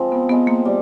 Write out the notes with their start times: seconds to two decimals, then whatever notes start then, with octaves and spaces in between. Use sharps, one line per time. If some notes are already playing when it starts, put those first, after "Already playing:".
Already playing: F3 G#3 C4
0.12 B3
0.30 G#3 B3 C4
0.47 A#3
0.65 G3